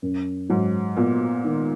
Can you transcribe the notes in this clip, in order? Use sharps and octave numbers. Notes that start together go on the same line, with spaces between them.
F#2
G#2 F#3
A#2 B3
D#3